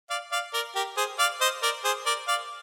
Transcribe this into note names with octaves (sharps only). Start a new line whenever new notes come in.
D5 F5
D5 F5
A#4 D5
G4 A#4
G#4 C5
D5 F5
C5 D#5
A#4 D5
G#4 C5
A#4 D5
D5 F5